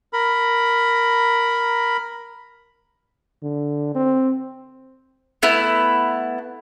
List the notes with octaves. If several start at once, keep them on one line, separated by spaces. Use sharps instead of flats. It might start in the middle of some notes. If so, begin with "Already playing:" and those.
A#4 B5
D3
C4
A3 B3 E4